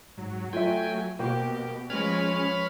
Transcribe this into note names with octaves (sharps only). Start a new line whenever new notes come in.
G#2 F#3
A3 F4 E5 G5 G#5
B2 A#3 F#4 G4 C5 G5
F3 G#3 C#4 B4 C#5 B5 F6